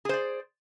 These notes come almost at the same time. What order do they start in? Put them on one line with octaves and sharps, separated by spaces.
G#4 C5 D5